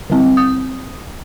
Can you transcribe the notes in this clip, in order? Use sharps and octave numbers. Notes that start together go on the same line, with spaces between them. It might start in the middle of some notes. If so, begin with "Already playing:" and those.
D3 G3 C4
D#6